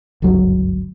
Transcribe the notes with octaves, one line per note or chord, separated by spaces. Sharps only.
G1 C#2 F#2 F#3